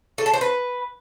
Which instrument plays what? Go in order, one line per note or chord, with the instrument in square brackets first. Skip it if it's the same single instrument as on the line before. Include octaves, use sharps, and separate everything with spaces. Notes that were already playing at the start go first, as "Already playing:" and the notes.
[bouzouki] A4
A5
C5
B4